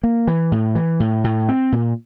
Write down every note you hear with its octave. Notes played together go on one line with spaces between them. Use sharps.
A#3
E3
A2
E3
A2
A2
C4
A#2